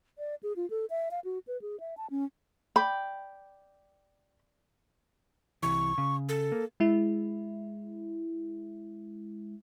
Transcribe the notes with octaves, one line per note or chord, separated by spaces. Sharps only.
D5
G#4
F4
A4
E5
F5
F#4
B4
G#4
E5
A5
C#4
D5 G5 B5
C2 E3 C#6
C#3
A4
A#3
G#3 E4